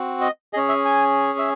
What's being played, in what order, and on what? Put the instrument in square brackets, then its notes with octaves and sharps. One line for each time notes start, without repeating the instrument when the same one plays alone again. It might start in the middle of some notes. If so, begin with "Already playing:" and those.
Already playing: [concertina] C4 F#4
D#5
G#4 D#5
C#4
E5
G#5
E5